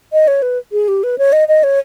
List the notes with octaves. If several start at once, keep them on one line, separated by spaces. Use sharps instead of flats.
D#5
C#5
B4
G#4
G4
B4
C#5
D#5
D#5
C#5